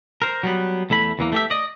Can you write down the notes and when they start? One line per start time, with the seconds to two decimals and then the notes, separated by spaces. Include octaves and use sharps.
0.22 A#4 C5
0.43 F#3 G3 B3
0.90 E2 A3 E4 B5
1.19 E2 E3 A#3
1.32 A3 G4 E5
1.50 D5 D#5